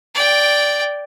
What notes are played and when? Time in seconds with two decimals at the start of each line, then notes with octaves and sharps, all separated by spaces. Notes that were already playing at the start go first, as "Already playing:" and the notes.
0.15 D5 G5